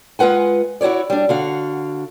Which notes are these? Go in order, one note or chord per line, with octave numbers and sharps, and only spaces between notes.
G#3 F4 B4 F#5 G#5
E4 F#4 G4 C#5 D5
G3 D4
D3 F#4 F5